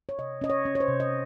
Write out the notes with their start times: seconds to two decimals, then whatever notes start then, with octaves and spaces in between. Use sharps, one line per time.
0.09 C#5
0.18 C3 D#5
0.41 C#4 D#5
0.50 C#5
0.65 C#4
0.75 C#5
0.80 C5
0.88 C3
1.00 D#5